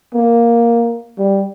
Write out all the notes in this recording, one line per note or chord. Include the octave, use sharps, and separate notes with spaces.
A#3
G3